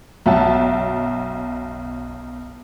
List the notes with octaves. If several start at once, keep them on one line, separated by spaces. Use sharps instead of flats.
B1 F#2 E5 F#5 A5